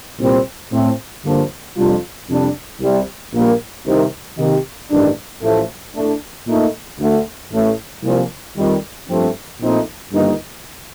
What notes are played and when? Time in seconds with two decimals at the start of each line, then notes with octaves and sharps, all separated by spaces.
0.19 C2 A#2 G3 C4
0.72 A2 A3 C4
1.24 G2 D3 F3 A#3 D4
1.77 F2 C3 G3 D4 F4
2.28 F2 C3 G3 D4
2.81 C2 C3 G3
3.33 A#1 A#2 G3 A#3
3.86 C2 C3 D#3
4.37 C3 D#3 A#3 D#4 G4
4.90 A1 G2 D#3 G3 D4
5.42 A1 A2 F3 A3
5.94 A2 A3 D4
6.47 A#2 A3 D#4
6.99 D2 D3 A3
7.52 A1 A2 A3
8.03 C2 A#2 F3
8.56 F2 D#3 G3
9.09 G2 F3 A3 C4
9.61 A#1 A#2 A3 C4 D#4
10.13 G1 G2 D#3 A#3 D#4